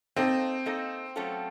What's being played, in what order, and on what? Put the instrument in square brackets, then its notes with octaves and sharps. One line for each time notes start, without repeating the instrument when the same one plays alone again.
[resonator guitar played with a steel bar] A#3 D#4 A4 D#5 [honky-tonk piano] C4
[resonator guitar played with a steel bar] A#3 D#4 A4 D#5
F#3 A3 C#4 F4 A4